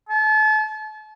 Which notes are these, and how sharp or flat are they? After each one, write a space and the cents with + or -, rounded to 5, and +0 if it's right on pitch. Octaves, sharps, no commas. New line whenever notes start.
A5 -35